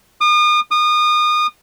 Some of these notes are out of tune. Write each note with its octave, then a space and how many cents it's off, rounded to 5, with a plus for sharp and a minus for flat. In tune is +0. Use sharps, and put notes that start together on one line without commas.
D#6 -40
D#6 -30